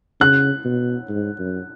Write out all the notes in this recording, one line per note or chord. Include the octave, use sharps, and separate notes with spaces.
C#3 F#6
B2
G#2
F#2